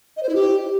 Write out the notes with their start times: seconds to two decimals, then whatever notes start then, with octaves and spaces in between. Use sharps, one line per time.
0.17 D#5
0.23 C5
0.29 E4
0.35 G4